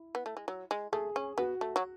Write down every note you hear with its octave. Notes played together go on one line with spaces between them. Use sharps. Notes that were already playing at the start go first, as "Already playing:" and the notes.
Already playing: E4
B3
A3
G#3
F#3
G#3
A3 G#4
C#4
B3 F#4
A3
F#3